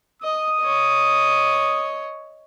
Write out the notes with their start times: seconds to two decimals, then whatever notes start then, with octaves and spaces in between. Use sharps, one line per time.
0.22 D#5 D#6
0.60 C#5 D#5